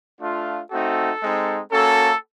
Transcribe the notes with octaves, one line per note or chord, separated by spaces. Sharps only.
A3 D4 F4
A3 C4 D#4 F#4 A4
G#3 C4 D#4
A#3 C#4 F#4 A4